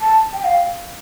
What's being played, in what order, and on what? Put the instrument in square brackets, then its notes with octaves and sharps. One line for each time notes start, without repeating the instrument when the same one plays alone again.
[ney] A5
G5
F5